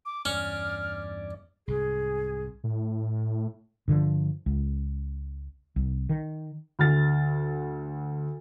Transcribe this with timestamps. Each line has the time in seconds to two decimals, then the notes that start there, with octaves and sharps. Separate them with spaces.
0.06 D6
0.25 E2 G2 C#4 D5 F6
1.68 C2 G#2 G#4
2.64 A2
3.88 G2 D3 D#3 F3
4.46 C#2
5.76 C2
6.09 D#3
6.79 D2 F6 A6